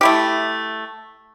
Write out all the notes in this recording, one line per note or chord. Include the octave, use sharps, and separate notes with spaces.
A3 E4 G4